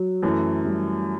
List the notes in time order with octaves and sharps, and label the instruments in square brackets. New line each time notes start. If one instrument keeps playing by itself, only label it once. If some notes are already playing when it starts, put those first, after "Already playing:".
Already playing: [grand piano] F#3
[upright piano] F#2 E3 A3
[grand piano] G3